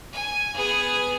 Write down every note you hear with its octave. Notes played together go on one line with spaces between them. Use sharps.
G#5
B3 G#4